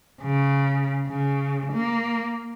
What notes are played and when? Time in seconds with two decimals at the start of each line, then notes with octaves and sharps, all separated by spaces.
0.22 C#3
1.08 C#3
1.73 A#3